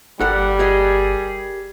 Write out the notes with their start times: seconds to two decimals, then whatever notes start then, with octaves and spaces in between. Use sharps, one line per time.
0.21 G1 G3 A4 A#4 F#5
0.59 G4 G#4 A#4 D#5